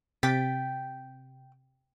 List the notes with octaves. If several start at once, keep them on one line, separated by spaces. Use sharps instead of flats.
C3 G5 A6 B6